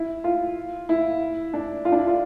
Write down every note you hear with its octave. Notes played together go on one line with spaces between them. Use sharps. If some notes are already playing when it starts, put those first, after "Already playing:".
Already playing: E4
F4
E4
D4
F4
D4
E4
F4